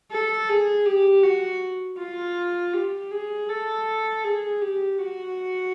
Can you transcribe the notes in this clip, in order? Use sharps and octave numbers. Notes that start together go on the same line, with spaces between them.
A4
G#4
G4
F#4
F4
G4
G#4
A4
G#4
G4
F#4